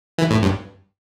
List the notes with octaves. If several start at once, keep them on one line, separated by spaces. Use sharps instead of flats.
E3
A2
G2